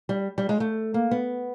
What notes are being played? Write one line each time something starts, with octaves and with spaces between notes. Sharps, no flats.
G3
G3
G#3
A3
A#3
B3